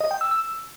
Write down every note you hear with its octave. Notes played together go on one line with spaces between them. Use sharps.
D#5
G5
E6
E6